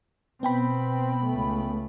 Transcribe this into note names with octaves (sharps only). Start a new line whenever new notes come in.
B2 B3 C4 G5 B5
C#2 A3